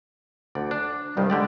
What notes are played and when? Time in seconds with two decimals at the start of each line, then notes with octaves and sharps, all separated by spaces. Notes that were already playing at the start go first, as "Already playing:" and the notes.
0.55 D2 D5
0.71 D4
1.17 C2 G2 D#3 G3
1.30 D3 G#3 G4 D5